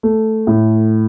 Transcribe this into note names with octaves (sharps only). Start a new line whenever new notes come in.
A3
A2